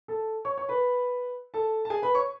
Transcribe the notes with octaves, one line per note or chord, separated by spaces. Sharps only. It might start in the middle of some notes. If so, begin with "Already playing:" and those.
A4 A5
C#5 C#6
C#5 C#6
B4 B5
A4 A5
A5
G#4 G#5
B4 B5
C#5 C#6